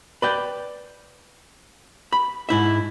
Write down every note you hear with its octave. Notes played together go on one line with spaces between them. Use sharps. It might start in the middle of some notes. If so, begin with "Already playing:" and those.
B4 D5 G5
B5
G#2 E4 E5